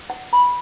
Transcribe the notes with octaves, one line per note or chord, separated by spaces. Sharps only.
F#5
B5